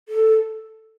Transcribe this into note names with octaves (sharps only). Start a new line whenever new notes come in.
A4